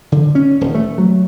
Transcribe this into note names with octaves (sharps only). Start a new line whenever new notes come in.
D3
C#4
D#1
A3
F#3